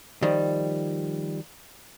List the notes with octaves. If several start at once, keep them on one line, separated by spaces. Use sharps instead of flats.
D#3 F3 G3